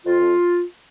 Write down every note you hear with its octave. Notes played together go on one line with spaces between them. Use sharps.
F2 F4
F2